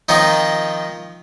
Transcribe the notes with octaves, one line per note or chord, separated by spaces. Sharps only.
D#3 F3 C4 D#4